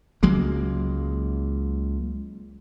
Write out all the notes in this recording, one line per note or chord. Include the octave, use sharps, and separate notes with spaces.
C#2 F#3 G#3 A#3